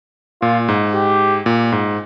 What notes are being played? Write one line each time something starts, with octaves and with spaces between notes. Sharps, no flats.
A#2 F4
G#2
G4
A#2
G#2